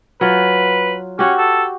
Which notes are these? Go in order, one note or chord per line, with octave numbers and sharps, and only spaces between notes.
F#3 F4 B4
C#4 F#4 G4
A4